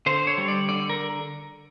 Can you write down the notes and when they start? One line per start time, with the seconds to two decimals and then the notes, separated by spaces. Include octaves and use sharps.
0.06 D3 C5
0.27 C#5
0.38 G3
0.48 D5
0.69 D3 D5
0.90 A#4